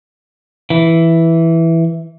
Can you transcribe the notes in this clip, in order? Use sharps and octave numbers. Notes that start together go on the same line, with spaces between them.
E3